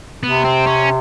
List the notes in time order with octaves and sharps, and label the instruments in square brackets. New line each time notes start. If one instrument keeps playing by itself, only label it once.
[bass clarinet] C3 [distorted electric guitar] B3
[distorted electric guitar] C4
C#4